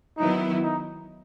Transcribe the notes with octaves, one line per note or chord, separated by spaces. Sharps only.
D#3 F#3 B3 D#4 E4
D#4